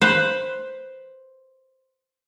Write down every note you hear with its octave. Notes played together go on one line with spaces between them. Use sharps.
B4 C5